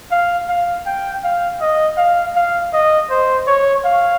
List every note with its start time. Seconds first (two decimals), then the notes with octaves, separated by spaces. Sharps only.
0.11 F5
0.48 F5
0.86 G5
1.23 F5
1.61 D#5
1.97 F5
2.35 F5
2.73 D#5
3.10 C5
3.47 C#5
3.85 F5